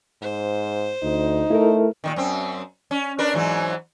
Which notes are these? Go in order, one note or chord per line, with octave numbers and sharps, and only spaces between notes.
G#2 C5
D2 D#4
A3 E4 A4 A#4
A#2 D3 D#3
F#2 C4
C#4
D4 A#4 B4
G#2 E3 F#3